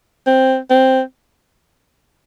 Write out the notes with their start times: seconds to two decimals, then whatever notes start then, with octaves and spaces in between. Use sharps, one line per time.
0.27 C4
0.71 C4